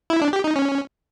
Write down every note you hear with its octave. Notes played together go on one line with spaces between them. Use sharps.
E4
D4
G4
D#4
C#4